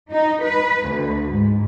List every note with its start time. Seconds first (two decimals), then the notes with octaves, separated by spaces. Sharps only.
0.12 D#4
0.44 B4
0.89 D2
1.33 G#2